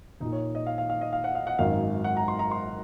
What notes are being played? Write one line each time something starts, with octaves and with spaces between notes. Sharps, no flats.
A#1 A#2 D#4
C#5
D#5
F5
F5
F5
D#5
F5
F#5
F5
F#5
G#1 F#2 D#3 F5
F#5
A#5
C6
A#5
C6